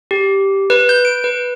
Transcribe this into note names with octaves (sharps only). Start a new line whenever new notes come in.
G4
B4
G6
D7
B4